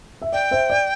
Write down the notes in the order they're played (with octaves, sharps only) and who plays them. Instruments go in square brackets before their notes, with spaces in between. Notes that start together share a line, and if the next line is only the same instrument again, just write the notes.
[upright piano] E5
[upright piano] D5 [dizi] G5
[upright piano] C5 E5
D5